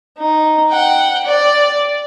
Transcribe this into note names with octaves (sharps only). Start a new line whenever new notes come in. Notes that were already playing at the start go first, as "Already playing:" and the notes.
D#4
F#5 G5
D5